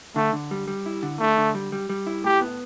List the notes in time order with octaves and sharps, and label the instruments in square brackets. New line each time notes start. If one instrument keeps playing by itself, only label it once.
[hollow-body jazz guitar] D3 [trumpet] A3
[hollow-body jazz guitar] D3
G3
G3
E4
D3
[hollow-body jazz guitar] D3 [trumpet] A3
[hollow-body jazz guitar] D3
G3
G3
G3
E4
[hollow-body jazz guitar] A2 [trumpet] G4
[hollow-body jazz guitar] B3